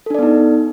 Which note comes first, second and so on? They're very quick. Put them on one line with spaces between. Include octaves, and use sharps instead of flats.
A4 D4 D5 B3 D#4